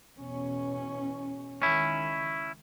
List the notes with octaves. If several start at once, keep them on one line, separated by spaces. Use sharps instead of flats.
E2 B2 C#4
C#2 D#3 C#4 E4